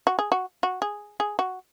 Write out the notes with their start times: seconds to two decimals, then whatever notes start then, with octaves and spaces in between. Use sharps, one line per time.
0.07 F#4
0.19 G#4
0.32 F#4
0.63 F#4
0.82 G#4
1.20 G#4
1.39 F#4